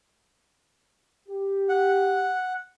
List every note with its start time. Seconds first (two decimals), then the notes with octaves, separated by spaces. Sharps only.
1.29 G4
1.69 F#5